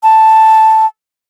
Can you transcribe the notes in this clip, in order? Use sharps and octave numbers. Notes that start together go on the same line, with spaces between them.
A5